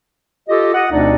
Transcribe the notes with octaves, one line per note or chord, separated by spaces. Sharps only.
F4 G4 A4 D#5
D#5 F#5
D2 B2 C4 D4 D#4 D5